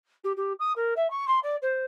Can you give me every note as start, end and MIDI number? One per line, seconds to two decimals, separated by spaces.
0.24 0.32 67
0.36 0.52 67
0.59 0.72 87
0.76 0.93 70
0.96 1.10 76
1.10 1.27 85
1.27 1.39 84
1.43 1.55 74
1.62 1.85 72